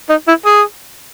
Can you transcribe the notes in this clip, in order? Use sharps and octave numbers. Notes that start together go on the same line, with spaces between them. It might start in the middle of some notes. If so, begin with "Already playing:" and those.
D#4
E4
G#4